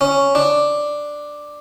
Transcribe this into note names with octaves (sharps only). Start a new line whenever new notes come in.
C#4
D4